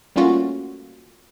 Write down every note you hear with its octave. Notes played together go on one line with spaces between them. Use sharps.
G3 A3 A#3 C#4 F4 F#4